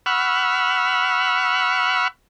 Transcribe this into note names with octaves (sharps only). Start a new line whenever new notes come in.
F#5 B5 C#6 E6 F6